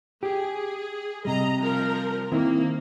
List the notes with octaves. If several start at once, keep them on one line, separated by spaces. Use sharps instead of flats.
G4 G#4
C3 G3 D#5 A#5
F3 A#4
D#3 A#3 C4 E4